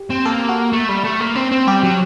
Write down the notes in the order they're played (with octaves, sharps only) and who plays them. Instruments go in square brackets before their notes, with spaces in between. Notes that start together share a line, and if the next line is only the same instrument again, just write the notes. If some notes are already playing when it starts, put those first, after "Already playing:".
Already playing: [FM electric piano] G4
[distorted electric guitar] C4
[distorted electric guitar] A#3 [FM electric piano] A4
[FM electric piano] F#4
[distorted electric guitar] A3
G3
A3
A#3
C4
C4
[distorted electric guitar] G3 [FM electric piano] G4
[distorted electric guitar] F#3